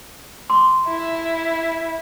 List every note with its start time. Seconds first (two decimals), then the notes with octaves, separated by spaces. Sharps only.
0.50 C6 D6
0.88 E4